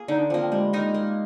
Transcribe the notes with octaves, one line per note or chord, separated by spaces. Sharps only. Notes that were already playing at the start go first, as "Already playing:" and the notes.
Already playing: A#3 G#4
D3 D#4
D4
F3 A#3 C4
C4
G3 G#3
A#3 D#4 A#4
A#3